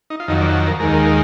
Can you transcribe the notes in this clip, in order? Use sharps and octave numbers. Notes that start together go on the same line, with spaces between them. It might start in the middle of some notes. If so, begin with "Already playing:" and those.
D#4
F4
F2 D#3 F#3 D#4
D5
A#4
D#2 D#3 G#3 A#4
A#4
A#4